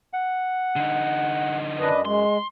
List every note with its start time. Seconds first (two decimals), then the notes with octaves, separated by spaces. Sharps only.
0.13 F#5
0.76 D3 D#4
1.79 F#2 D4 B4 D#5
2.05 G#3 C6